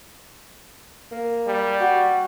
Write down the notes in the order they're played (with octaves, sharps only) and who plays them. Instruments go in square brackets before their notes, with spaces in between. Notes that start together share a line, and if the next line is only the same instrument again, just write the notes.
[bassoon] A#3
[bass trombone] G3
[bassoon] F#4